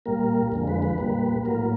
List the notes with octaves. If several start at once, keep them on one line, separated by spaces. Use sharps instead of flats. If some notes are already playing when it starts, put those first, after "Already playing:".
A#2 G3 A#3 A#4
F2 D3 F3 G#3
B4
B4
A#2 G3 A#3
A2 F#3 A#3 A#4